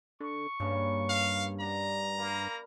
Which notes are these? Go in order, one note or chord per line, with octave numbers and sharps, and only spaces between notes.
D3 C#6
G2 C#3 A#3 B4
F5
D5 F#5 A#5
A#3 A#4 B5